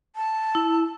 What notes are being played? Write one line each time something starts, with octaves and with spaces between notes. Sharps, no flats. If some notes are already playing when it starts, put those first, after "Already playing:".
A5
E4